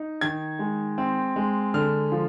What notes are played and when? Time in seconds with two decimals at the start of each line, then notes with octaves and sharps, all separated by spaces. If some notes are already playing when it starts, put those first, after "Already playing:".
Already playing: D#4
0.21 D#3 G#6
0.59 G#3
0.98 C4
1.36 G#3
1.74 D3 F6
2.12 F3